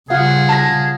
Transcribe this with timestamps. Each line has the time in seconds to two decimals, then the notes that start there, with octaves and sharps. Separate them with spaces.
0.10 C#3 G3 F4 G#4 F5 F#5
0.49 A5 A#6